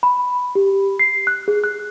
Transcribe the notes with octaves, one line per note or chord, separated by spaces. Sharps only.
B5
G4
C7
F#6
G#4
F#6